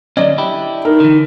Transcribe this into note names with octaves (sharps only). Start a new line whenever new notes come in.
D3 F#3 C#4 D5 D#5
D4 E4 G4
D#4 A#4
D3 E3